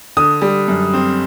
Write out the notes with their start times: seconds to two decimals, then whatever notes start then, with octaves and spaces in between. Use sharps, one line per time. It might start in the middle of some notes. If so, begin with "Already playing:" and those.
0.17 D3 D#6
0.42 G3
0.68 F#2
0.93 C4